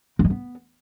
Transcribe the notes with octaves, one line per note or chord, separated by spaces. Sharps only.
A#3
G#3
B3